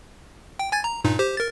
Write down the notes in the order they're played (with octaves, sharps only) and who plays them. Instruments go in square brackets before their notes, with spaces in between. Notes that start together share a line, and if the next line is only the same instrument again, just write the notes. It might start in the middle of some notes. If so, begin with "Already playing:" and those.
[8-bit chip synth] G5
G#5 G#6 A6
A#5
G2 A#2 D#4
G4 C5
A#4 A6